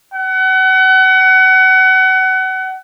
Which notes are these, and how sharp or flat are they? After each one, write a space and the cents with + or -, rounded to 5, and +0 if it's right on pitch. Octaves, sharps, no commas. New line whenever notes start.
F#5 +30